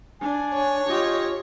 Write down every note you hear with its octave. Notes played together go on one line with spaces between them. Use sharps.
D4 G#5
C#5
F4 G4 D#5